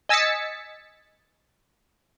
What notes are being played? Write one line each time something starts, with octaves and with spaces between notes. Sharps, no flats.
D#5 G#5 E6 A6 B6 C#7